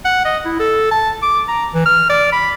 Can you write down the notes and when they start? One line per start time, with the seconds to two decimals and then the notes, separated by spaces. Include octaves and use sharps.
0.05 F#5
0.25 D#5
0.45 E4
0.59 A4
0.91 A5
1.22 D6
1.48 A#5
1.74 E3
1.86 F6
2.10 D5
2.32 B5